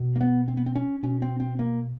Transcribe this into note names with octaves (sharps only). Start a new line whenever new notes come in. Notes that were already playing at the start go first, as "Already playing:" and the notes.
Already playing: B2
A#3
B3
C4
B3
C4
C#4
B2 C#4
C4
C4
A#3